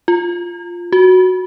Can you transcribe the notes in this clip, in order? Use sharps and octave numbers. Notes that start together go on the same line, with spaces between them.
F4
F#4